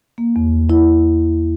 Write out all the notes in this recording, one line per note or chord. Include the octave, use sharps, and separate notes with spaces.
A#3
E2
E4